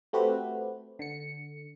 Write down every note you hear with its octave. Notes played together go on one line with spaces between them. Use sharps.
A3 C4 F#4 G4 B4
D3 C#7